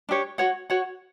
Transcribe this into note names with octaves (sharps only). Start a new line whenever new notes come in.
D4 G4 C#5
F#4 C#5 F#5
F#4 C#5 F#5